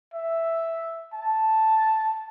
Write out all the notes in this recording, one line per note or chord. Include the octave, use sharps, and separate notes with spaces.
E5
A5